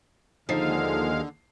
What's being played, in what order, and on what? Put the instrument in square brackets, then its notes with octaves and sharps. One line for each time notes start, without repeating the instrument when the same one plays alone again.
[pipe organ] D#2 G#3 F5 [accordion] D3 [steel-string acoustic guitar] F3 [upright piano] D#4 C7